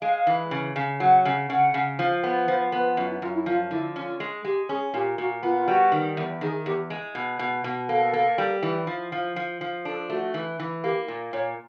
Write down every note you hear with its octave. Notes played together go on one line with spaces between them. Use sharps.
G#3 F5
E3
C#3
C#3
F#3 F#5
C#3
C#3 F#5
C#3
F3
B3
F3 C5
B3 B4
F#2 F4
E4
F#2 F4
E4
F3 F4
D3 E4
C#4 F4
G#3
G#3 G4
C#4 G#4
A#2 G4
A#2 F#4
B3 F4
F4
G3 F#4
D#3
E2
D#3 G#4
E2 G4
G#3
B2
B2
B2
A#3 A4
A#3
G3
E3
F3
F3
F3
F3
D4 A4
A3 F#4
E3
E3
A#3 G4
A#2
A#2 C#5